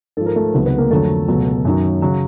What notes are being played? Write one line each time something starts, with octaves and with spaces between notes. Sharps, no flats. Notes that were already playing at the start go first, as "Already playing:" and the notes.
G#2 F3 A4
A#4
A3 A4
C#2 C3 D#3 F#3 B3 B4
B3 B4
A#3 A#4
F2 D3 F#3 A3 A4
C#2 B2 F#3
F#2 D#3 F#3
C#3 F#3